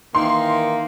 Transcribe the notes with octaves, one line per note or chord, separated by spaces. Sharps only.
D#3 E3 A#3 C6